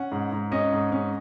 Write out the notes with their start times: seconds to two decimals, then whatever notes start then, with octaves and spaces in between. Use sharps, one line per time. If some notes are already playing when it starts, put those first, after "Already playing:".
Already playing: C#4 F#5
0.12 G#2
0.32 G#2
0.52 C#4 D#5
0.73 G#2
0.92 C#4